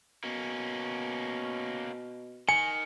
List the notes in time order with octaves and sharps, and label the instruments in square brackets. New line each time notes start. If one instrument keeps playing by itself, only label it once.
[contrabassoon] B2 [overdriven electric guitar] A#3 C#4
[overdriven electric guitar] D#3 [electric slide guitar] G#5 [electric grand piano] C#7